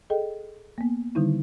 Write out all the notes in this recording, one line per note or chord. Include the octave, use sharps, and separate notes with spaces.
G#4 A4 D#5 G5
A#3 B3
D3 D#3 G3 D#4 E4